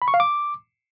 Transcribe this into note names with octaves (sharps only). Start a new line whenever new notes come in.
B5
C#6
F5
D6